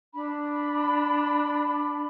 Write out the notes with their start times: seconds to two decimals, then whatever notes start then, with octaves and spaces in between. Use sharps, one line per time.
0.13 D4 B5